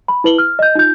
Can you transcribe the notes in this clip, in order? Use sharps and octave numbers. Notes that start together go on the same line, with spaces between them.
B5
E4 B4 F#7 G7
F6
D#5 G6
D#4 F4 G6